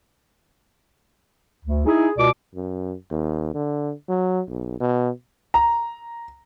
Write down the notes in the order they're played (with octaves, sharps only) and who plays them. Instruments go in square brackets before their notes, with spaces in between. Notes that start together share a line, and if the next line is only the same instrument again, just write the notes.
[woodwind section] D2
D#4 E4 G#4
C#2 B2 D5 D6
[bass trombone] F#2
D#2
D3
F#3
B1
B2
[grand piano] A#5